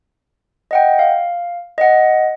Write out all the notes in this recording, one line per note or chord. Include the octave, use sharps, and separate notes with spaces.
D#5 F#5 G5
F5
D#5 F#5